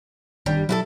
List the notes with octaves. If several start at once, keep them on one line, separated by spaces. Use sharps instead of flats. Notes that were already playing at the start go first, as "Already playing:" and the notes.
G1 D#3 G3 D4
F#3 E4 F#4 A4